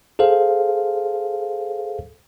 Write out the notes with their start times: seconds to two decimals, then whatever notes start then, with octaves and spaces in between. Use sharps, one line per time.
0.19 G#4 A4 C5 F5